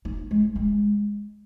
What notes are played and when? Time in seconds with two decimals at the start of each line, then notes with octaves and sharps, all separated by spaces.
0.05 D#4
0.31 G#3
0.56 G#3